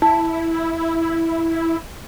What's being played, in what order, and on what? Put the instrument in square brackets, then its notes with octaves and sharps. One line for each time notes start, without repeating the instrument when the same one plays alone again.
[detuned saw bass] E4 [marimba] A5